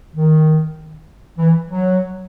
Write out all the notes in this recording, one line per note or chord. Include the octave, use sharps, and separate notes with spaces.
D#3
E3
F#3